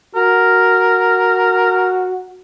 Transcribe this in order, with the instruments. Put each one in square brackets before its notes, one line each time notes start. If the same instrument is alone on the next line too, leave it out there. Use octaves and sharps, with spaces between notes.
[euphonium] F#4 [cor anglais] A#4